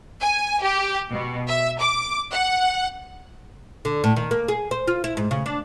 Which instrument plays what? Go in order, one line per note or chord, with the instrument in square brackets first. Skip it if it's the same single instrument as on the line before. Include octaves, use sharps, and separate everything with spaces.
[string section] G#5
G4
B2
E5
D6
F#5
[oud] D3
A2
D#3
A#3
G#4
C5
F4
E4
G#2
C#3
D4